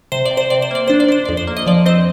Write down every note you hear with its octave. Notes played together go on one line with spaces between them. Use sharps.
C3 C5
D5
C3
C5
C3 D5
C5
A#3 D5
D4 C5
D5
D4 C5
F2 D5
C5
A#3
D#5
F3 D5
C4 C5 D#5